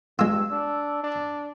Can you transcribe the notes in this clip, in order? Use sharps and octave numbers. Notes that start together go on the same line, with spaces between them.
G2 G#3 F4 E6
D4
D4